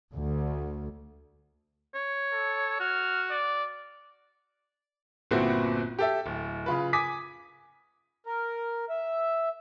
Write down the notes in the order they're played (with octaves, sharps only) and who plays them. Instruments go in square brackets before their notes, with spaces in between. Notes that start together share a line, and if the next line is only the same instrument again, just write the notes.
[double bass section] D2
[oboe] C#5
[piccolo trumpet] A4
[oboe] F#4 [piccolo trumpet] F6
[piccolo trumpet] D5
[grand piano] G1 A#2 B3 C4 E4 F#4
G4 A4 E5
D1
C#3 F4 B4
G#5 D6 D#6 B6
[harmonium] A#4
E5